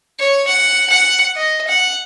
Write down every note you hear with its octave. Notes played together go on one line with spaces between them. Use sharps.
C#5
F#5
F#5
D#5
F#5